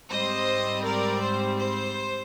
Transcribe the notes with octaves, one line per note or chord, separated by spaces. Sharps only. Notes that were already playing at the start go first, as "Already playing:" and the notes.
G#2 G3 C4 C5 D#5
A#4 D5
C5
C5